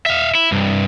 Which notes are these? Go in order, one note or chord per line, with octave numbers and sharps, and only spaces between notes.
E5 F5
E4
C2 G2